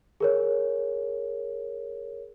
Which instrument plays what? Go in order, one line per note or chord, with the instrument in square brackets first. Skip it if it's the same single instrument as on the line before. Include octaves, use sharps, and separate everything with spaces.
[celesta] G#4 A#4 C#5